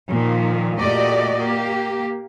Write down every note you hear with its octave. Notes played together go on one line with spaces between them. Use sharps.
A#2 D#3 F3
A#2 A3 F#4 G4 D5 D#5
A#3 G4